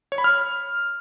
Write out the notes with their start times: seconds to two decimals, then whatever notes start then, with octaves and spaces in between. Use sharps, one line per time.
0.12 C#5
0.18 B5
0.24 F6